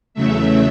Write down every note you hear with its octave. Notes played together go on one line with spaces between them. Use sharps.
E2 C#3 F#3 A3 E5